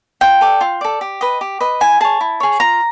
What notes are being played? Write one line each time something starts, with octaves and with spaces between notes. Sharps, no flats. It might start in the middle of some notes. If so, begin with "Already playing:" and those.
F4 G5
A4 D5
F4
A4 D5
G4
B4 D#5
G4
B4 D#5
E4 G#5
G#4 C#5 A5
E4
G#4 C#5
F4 A#5